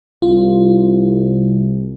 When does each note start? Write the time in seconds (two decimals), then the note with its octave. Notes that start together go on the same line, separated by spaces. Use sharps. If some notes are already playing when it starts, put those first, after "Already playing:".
0.22 C2 F4